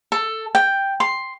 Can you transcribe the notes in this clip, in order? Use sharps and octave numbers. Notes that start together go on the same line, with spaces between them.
A4
G5
C6